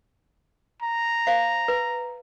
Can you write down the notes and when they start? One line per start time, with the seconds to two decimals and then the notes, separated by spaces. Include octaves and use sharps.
0.82 A#5
1.27 C5 F5
1.68 B4